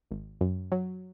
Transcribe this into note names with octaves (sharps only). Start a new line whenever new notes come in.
G#1
F#2
F#3